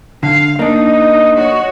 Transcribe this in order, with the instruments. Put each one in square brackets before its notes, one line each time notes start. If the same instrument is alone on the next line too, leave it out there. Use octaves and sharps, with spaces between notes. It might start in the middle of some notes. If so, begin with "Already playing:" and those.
[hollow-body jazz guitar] D3 [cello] F5
[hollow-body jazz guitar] A#3 D4 [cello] D#4 [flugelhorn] D#5
[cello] F#4 C#5